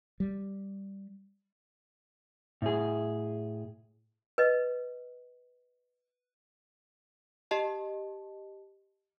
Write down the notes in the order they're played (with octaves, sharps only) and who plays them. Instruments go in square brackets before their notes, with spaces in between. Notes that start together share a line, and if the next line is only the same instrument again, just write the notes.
[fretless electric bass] G3
[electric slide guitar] A2 G#4
[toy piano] B4 D#5
[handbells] G4 D#5 A5